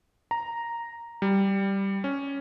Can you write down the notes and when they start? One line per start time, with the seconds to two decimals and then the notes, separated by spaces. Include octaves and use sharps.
0.31 A#5
1.22 G3
2.04 C#4